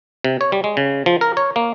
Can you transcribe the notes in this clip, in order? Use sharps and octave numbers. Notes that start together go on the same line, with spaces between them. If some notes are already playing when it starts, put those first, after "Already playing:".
C3
C#5
G3
G#3
C#3
F3
A#4
C#5
A#3